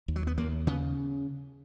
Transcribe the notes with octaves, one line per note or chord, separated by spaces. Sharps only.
D#2
F#3
B3
D#2 A#3
C#3 B3